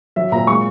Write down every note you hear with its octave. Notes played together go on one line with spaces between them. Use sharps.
F#3 E5
A#2 A#5
G#3 C#6